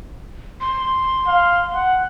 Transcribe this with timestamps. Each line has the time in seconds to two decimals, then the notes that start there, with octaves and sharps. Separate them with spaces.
0.61 C6
1.28 F5
1.74 F#5